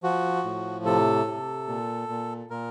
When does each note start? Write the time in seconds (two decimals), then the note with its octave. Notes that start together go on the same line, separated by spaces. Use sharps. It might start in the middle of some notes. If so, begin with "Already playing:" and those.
0.03 F3 F#4
0.44 A2
0.85 C3 A4
1.26 C3
1.68 A#2
2.09 A#2
2.50 A#2 A#4